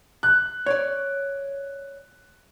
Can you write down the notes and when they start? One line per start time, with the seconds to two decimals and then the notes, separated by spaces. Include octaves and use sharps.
0.23 F#6
0.66 C#5 D5